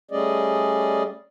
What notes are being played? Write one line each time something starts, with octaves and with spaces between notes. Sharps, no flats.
G3 A3 C#4 G#4 D5 D#5